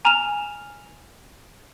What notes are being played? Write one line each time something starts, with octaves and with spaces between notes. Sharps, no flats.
G#5 A#5 F6 E7 F7